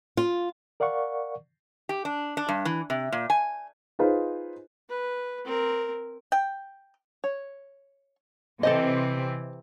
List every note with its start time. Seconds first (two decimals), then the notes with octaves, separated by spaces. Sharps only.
0.17 F4
0.80 A#4 D5 F5 F#5 C#6
1.89 G4
2.05 D4
2.37 D4
2.49 G2
2.65 E3
2.90 C3
3.12 A#2
3.30 G#5
3.99 D#4 F4 G#4 B4 C5
4.89 B4
5.45 C4 A#4
6.32 G5
7.24 C#5
8.63 C3 E3 C4 A4 C5 D#5